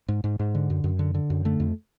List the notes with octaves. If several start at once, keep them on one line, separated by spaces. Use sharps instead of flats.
G#2
G#2
G#2
D3
F#2
F#2
D3
D3
F#2
D3 A3
F2